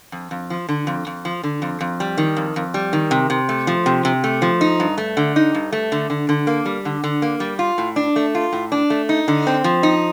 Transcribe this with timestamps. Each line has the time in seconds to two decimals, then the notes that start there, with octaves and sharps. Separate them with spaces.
0.12 F2
0.31 F2
0.50 F3
0.69 D3
0.87 F2
1.07 F2
1.25 F3
1.43 D3
1.62 F2
1.81 F2
2.00 G3
2.18 D#3
2.37 F2
2.56 F2
2.74 G3
2.93 D#3
3.11 C3
3.30 C3
3.49 A3
3.67 F3
3.86 C3
4.05 C3
4.24 A3
4.42 F3
4.61 D#4
4.80 G2
4.98 A3
5.17 D3
5.36 D#4
5.54 G2
5.72 A3
5.92 D3
6.10 D3
6.29 D3
6.47 A#3
6.66 G3
6.85 D3
7.04 D3
7.22 A#3
7.40 G3
7.59 F4
7.78 A2
7.96 D4
8.16 A3
8.35 F4
8.53 A2
8.72 D4
8.90 A3
9.09 D#4
9.28 D3
9.47 C4
9.64 F3
9.83 D#4